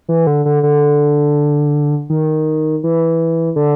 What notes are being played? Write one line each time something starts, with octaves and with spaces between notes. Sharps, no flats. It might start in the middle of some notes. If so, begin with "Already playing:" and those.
E3
D3
D3
D3
D#3
E3
D3